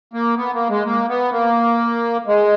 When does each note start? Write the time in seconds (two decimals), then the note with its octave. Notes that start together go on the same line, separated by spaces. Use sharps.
0.13 A#3
0.37 B3
0.54 A#3
0.69 G#3
0.85 A#3
1.09 B3
1.32 A#3
2.27 G#3